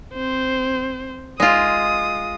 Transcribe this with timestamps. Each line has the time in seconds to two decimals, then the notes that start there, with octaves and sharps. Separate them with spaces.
0.14 C4 C5
1.40 G#3 F4 D#6